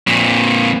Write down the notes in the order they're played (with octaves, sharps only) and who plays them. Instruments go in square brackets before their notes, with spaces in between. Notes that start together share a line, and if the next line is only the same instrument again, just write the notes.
[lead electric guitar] F2 A#2